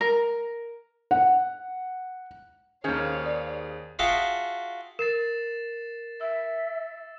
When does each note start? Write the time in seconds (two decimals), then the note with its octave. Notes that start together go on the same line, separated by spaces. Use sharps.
0.01 A#4
1.11 F#5
2.84 D#2 D#3 C#4 G#4 C5 C#5 F5
3.26 D5
3.99 F4 F#4 G#4 E5 G5 A5
4.99 A#4 A6 C7 E7
6.21 E5 E6